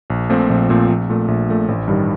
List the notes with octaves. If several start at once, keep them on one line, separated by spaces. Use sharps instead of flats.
A#1
A#2 F3 A3 C4
A#1
A#2 F3 A3 C4
A#1
A#2 A3
A#1
A#2 A3
A1
G2 D#3 G3